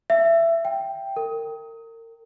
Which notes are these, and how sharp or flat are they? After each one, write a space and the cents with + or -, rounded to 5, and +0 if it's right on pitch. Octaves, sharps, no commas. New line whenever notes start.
E5 +20
G5 +0
A#4 -35